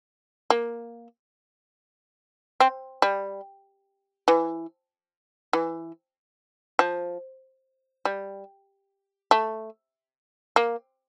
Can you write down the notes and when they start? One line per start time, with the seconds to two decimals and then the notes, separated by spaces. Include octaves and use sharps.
0.50 A#3
2.60 C4
3.02 G3
4.28 E3
5.53 E3
6.79 F3
8.05 G3
9.31 A3
10.56 A#3